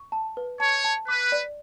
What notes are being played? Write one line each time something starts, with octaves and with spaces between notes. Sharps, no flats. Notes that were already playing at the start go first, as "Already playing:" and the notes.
Already playing: C#6
A5
B4
C#5 A5
A5
B4 D6
D5